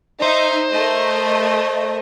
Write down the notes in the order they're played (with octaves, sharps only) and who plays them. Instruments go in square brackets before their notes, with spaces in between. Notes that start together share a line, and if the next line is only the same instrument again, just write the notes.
[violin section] D#4 E5 [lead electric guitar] C5
[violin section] A3 A#4 D#5